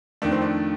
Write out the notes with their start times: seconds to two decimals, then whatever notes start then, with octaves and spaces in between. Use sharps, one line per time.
0.22 F2 D#3 A3 D4
0.32 C4
0.42 D4